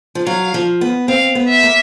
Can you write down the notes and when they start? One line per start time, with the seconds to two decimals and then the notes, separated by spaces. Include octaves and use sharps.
0.15 F3
0.27 F#3 F5
0.54 F3
0.81 B3
1.08 C4 F5
1.35 B3
1.49 E5
1.63 A#3